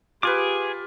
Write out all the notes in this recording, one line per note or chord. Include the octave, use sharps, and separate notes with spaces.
F4 G4 G#4 B4 D6